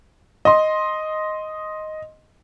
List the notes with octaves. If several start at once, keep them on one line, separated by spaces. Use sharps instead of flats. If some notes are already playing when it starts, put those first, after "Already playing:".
D#5 C6